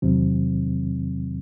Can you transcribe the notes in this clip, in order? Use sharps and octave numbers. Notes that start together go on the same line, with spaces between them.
E2 C3 D#3 F#3 C4